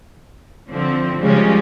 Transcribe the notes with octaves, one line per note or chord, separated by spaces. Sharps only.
D3 E3 F3 C4
C#3 F3 G3 G#3 C#4